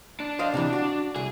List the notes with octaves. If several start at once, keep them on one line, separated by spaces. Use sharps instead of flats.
D4
C5 D#5 F5
C3 D#3 E3
F#4
C2 G#4